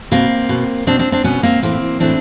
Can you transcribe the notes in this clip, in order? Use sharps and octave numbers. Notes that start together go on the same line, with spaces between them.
B2 A#3 C4
B2
B2 C4 D4
C4 D4
C4 D4
B2 B3 C#4
A#3 C4
A2 E3 A#3 C4
A2 E3 C4 D4